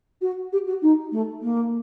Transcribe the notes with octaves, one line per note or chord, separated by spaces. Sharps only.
F#4
G4
F#4
D#4
A3
A#3